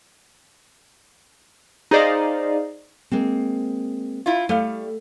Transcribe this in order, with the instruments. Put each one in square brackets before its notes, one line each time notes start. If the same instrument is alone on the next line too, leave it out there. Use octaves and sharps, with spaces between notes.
[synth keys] D#4 G#4 C5 D5 D#5 F5
[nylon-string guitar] G#3 A#3 C4
[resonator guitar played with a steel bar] E4 F4
[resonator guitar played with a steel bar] G3 F5 [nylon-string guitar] A3